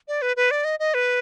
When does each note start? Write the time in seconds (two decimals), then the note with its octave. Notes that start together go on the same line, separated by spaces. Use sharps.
0.08 D5
0.22 B4
0.36 B4
0.51 D5
0.65 D#5
0.80 D#5
0.94 B4